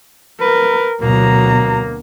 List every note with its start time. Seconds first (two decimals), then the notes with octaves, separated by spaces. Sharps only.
0.41 A#4 B4
1.01 D2 B2 F#3 A#3 A#5